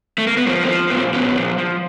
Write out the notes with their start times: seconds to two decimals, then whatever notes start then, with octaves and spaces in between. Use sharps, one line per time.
0.18 A3
0.27 A#3
0.37 B3
0.47 F3 A#3 C4
0.64 A#3 C4
0.69 F3
0.90 A#2 B3
0.97 A#3 C4
1.13 A#2 B3 C#4
1.35 F3
1.58 F3